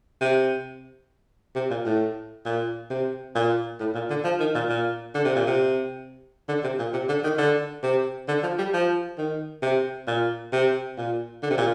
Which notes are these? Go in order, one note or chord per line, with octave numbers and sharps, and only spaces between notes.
C3
C3
A#2
A2
A#2
C3
A#2
A2
A#2
D3
F3
D#3
A#2
A#2
D3
C3
A#2
C3
D3
C3
A#2
C3
D3
D#3
D3
C3
D3
F3
G3
F3
D#3
C3
A#2
C3
A#2
D3
C3
A#2